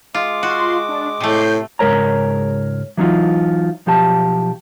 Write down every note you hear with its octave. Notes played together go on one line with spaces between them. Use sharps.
G#3 F4 D6
F4 F#4 C6
D4
A2 C3 A3 G6 C7
C#2 G#2 G#3 A#4 C#5 A#5
E3 F#3 D#4 F4
B1 F3 G4 A5